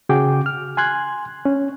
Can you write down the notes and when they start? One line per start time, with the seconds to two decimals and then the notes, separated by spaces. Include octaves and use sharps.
0.09 C#3 F#4 G#4 G5 D6
0.46 F6
0.77 G#5 C6 F#6 G#6
1.45 C#4